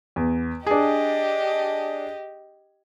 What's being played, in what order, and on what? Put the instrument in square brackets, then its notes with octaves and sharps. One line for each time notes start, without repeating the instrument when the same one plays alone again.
[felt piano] E2
[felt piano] D4 G#4 [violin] G4 D#5